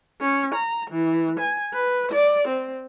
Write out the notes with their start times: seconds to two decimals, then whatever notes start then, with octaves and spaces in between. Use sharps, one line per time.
0.21 C#4
0.55 A#5
0.91 E3
1.40 G#5
1.73 B4
2.12 D5
2.48 C4